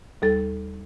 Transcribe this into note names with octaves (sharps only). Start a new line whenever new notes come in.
D#2 G3 A4 A6